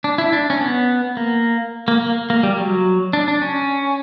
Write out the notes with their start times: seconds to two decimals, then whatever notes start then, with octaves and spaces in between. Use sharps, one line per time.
0.04 D4
0.18 E4
0.33 D4
0.50 C#4
0.61 B3
1.17 A#3
1.88 A#3
2.01 A#3
2.30 A#3
2.43 G3
2.58 F#3
3.13 D4
3.28 D4
3.42 C#4